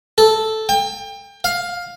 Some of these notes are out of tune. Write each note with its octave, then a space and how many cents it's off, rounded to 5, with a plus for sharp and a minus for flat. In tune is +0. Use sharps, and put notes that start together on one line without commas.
A4 -5
G5 +30
F5 +10